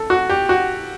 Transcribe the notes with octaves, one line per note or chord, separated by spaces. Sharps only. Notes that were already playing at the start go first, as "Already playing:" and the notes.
Already playing: A4
F#4
G4
F#4